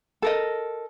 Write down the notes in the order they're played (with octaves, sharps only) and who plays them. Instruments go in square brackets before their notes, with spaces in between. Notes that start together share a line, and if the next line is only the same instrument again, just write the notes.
[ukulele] A4 A#4 D#5